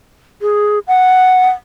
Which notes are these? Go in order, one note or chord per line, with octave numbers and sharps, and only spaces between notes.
G#4
F#5